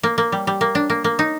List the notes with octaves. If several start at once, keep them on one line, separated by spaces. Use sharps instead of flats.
A#3
A#3
G3
G3
A#3
D4
A#3
A#3
D#4